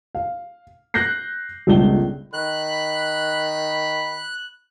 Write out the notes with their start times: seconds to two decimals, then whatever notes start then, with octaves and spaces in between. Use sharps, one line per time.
0.15 F5
0.94 F#6 G6 A#6 C7
1.67 G1 C#2 D4 G7
2.33 D#3 B5 F#6